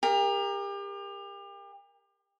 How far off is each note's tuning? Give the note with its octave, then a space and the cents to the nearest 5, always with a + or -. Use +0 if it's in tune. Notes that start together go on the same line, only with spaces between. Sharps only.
G4 +35 A#4 +0